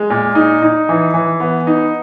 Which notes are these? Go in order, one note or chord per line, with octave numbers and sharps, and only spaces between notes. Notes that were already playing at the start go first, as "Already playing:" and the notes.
Already playing: G#3
A#2
D#4
D#4
E3
E3
B3
D#4